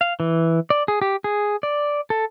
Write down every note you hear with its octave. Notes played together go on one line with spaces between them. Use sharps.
F5
E3
D5
G#4
G4
G#4
D5
A4